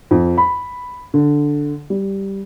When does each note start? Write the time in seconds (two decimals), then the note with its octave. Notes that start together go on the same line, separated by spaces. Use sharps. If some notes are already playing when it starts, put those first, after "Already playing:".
0.11 F2
0.38 B5
1.14 D3
1.90 G3